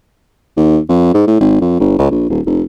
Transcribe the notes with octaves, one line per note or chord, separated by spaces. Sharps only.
D#2
F2
G#2
A2
G#1
F2
G1
C#2
A#1
D#1
F1